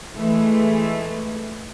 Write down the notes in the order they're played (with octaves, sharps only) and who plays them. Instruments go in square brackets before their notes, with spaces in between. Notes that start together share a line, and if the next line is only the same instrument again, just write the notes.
[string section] E3 G#3 A3